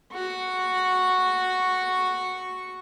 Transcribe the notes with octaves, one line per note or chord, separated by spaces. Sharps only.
F#4 C#6